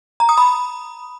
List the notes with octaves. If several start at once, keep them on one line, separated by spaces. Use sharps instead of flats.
A#5
D#6
B5